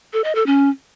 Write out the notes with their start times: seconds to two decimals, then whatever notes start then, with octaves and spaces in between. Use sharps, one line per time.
0.13 A4
0.24 D#5
0.35 A4
0.46 C#4